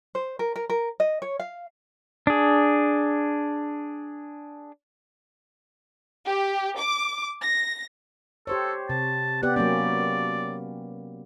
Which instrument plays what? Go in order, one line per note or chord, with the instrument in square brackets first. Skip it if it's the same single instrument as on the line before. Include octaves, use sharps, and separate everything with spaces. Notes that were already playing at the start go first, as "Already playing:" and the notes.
[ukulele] C5
A#4
A#4
A#4
D#5
C#5
F5
[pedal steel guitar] D4 G#4
[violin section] G4
D6
A#6
[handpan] G4 C5 C#5 [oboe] A4
[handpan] C3 [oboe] A5
[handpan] B3 G4 D5 [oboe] F#5
[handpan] F#3 A#3 C#4 [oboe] D5